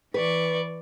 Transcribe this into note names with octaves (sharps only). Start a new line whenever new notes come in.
E3 B4 D5 C#6